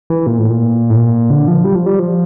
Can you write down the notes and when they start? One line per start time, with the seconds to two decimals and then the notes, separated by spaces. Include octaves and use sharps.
0.10 E3
0.27 A#2
0.38 A2
0.50 A#2
0.90 A2
0.96 A#2
1.30 D3
1.48 F3
1.64 G3
1.75 F3
1.86 G3
1.99 F3